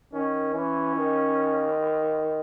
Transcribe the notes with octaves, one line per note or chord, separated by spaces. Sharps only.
D#3 C#4
E3 C#4
D#3